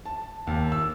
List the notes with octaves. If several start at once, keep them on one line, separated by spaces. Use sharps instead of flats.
A5
D#2
E6